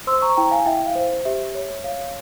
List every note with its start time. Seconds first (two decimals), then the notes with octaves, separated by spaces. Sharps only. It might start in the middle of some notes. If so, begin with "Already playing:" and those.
0.07 C5 C6 E6
0.22 A#5 C#6
0.37 E4 G5 A#5
0.51 F5 G#5
0.66 E4 E5 G5
0.86 F5
0.95 C5
1.25 G4 E5
1.55 C#5
1.84 C#5 F5